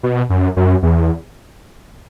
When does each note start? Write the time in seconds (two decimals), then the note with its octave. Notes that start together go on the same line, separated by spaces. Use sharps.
0.03 B2
0.30 F#2
0.57 F#2
0.83 E2